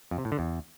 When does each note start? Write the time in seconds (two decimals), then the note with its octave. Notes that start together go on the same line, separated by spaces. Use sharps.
0.11 F2
0.18 C3
0.25 A2
0.32 D3
0.39 E2